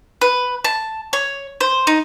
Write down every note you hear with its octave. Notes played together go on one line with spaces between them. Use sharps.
B4
A5
C#5
C5
D#4